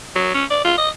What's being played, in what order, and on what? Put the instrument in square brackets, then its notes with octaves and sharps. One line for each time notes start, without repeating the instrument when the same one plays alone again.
[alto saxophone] F#3
C#4
D5
F4
D#5